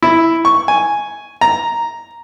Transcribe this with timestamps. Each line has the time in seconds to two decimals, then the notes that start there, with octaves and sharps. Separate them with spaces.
0.03 E4
0.45 C#6
0.68 G#5
1.41 A#5